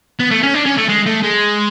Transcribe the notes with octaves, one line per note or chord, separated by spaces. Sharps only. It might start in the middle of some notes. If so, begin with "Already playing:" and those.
B3
A3
C#4
D4
C#4
A3
G#3
A3
G#3